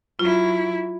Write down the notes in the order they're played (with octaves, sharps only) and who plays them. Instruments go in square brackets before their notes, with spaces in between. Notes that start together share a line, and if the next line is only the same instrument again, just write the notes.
[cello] F#3 E4 [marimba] F4